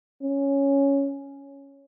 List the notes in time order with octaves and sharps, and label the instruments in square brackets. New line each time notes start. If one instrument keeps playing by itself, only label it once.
[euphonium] C#4